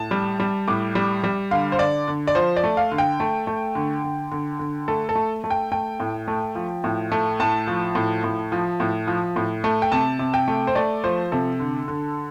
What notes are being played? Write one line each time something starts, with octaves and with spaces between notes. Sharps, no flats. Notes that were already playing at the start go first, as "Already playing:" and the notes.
Already playing: A2 A5
G3
G3
A2 D6
G3
G3
D3 F5
C5
D3 D5
D3
D5
F3 C5
D5
A3
F5
D3
G5
A3
A3
D3
D3
D3
D3
A3 A4
A4
A3
A3
G5
A3 G5
A2
A3
F3
A2
A3
A2 A5
F3
A2
A2
F3
A2
F3
A2
A3
G5
C3 A5
C3
G5
A3
C5
A3 D5
F3 C5
C3 A4
D3
D3